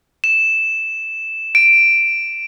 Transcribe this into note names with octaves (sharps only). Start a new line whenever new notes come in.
E7
D7